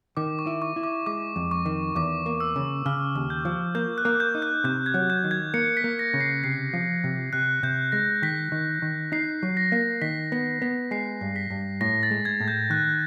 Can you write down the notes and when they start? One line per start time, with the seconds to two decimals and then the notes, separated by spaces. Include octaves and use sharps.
0.17 D#3 D6
0.39 C#6
0.47 E4
0.62 C#6
0.76 E4
0.84 D6
1.06 G#3 D6
1.36 F2
1.51 C#6
1.66 D#3
1.95 E2 D6
2.26 A#3
2.40 E6
2.56 C#3
2.86 C#3 F6
3.15 D#2
3.30 G6
3.45 F3
3.75 A#3 G6
3.98 F#6
4.05 A#3
4.20 G6
4.35 D#4
4.42 F#6
4.64 C3 G6
4.86 G#6
4.94 F#3
5.10 G6
5.24 D#3
5.31 G#6
5.54 A#3 C#7
5.77 B6
5.84 A#3
5.99 A#6
6.14 C#3
6.21 C7
6.44 C3 C7
6.73 F3
7.04 C3
7.33 C3 F#6
7.63 C3 G6
7.92 G#3 A#6
8.22 D#3 B6
8.52 D#3
8.82 D#3
9.12 D#4 C7
9.43 F#3
9.57 A#6
9.72 A#3
10.01 D#3 B6
10.32 B3
10.62 B3
10.91 G#3 C7
11.21 G2
11.36 B6
11.51 G2
11.81 A2 A#6
12.03 A6
12.11 G#3
12.25 G#6
12.40 A2
12.48 G6
12.70 D#3 F#6